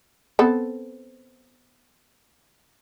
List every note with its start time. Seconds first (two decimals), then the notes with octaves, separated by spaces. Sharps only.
0.39 B3 C4 A4